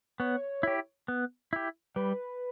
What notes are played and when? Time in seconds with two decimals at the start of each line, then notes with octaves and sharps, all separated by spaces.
0.20 B3 C#5
0.63 E4 G4
1.08 B3
1.53 E4 G4
1.96 G3 B4